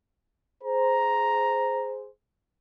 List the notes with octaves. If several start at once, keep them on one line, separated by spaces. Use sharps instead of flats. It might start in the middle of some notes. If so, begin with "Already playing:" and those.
G#4 C5 A#5